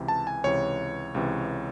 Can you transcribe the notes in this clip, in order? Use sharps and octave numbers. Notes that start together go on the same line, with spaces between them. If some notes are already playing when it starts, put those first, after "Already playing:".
Already playing: C#2 C3 E3
A5
G#5
C#2 C3 E3 C#5
C#2 C3 E3